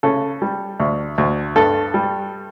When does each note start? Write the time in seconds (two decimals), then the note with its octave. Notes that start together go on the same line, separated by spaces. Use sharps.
0.03 C#3 A4
0.42 G3
0.80 D2
1.18 D2
1.56 G2 A4
1.94 G3